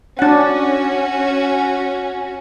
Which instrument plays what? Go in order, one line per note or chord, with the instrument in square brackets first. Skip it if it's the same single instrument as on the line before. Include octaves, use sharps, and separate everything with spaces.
[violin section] C#4 F#4 [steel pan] D4 F#5